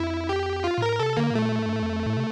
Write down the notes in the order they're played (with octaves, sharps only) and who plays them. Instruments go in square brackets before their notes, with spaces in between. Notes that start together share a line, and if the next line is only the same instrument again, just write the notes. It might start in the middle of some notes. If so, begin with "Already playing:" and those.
Already playing: [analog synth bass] F2 [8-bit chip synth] E4
[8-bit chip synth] G4
F4
[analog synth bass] A#2
[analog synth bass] A2 [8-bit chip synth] A#4
[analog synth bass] C3 [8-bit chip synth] A4
[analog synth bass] D3 [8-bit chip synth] A#3
[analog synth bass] A2
[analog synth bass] A#2 [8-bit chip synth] A3
[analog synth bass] A2
G2
A2
F2
A2
C3